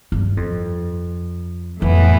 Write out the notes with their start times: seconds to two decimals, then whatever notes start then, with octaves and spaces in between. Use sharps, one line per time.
0.12 G2
0.37 F2
1.82 F2 A2 E3 B3 E4